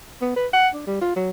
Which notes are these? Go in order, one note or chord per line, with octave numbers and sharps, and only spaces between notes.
B3
B4
F#5
D4
G3
F4
F#3